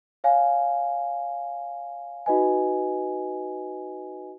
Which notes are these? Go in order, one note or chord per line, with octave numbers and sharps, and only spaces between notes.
C#5 F5 G#5
D#4 F#4 B4 D#5 G#5